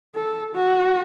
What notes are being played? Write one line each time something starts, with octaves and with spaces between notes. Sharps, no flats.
A4
F#4